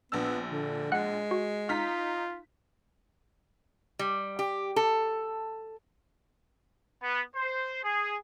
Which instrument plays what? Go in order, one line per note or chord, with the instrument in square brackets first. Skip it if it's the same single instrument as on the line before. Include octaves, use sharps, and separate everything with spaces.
[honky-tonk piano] A#1 D4 E6 [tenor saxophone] B3
[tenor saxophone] D3
[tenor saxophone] G#3 [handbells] F#5 F#6
[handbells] F#4
[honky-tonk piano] D#4 A#5 B6 [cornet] F4 [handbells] F6
[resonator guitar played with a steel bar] G3
G4
A4
[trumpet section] B3
C5
G#4